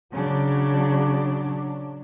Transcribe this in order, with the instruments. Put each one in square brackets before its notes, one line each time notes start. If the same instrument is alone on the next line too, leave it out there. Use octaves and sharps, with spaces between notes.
[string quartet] C#3 [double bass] F#3 D4